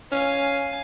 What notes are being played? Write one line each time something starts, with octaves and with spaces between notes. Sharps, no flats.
C#4 F5 G#5